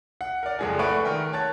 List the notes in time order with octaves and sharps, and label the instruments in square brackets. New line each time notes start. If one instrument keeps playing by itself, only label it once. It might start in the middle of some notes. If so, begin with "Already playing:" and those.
[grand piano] F#5
A#4 D5
F#1 F2 G#3 A4 G#5
A3 B4 D5 F#5 C#6 D7
D#3 A#4 G5
C#5 A5 F#6 A6